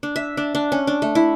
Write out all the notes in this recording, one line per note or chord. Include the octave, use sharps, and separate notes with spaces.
D4
E5
D4
D4
C#4
D4
A3
E4